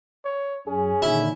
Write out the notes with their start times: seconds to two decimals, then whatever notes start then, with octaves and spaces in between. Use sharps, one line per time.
0.25 C#5
0.67 F#2 C#4 G#4
1.02 A#2 D3 D#3 E4